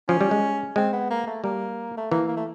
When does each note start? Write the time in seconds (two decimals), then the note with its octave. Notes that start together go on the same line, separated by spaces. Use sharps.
0.09 F3 C#4
0.21 G3
0.31 G#3
0.76 G#3 C4
0.93 B3
1.11 A#3
1.28 A3
1.44 G3 A#3
1.98 A3
2.11 E3 A#3
2.28 A#3
2.37 A3